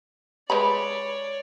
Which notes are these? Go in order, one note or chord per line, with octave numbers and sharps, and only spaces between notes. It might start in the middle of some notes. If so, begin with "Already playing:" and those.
G#3 B4 C#5 D5 B5